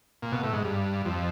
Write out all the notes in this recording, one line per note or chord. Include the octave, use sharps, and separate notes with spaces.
A#2
B2
A2
G#2
G2
F2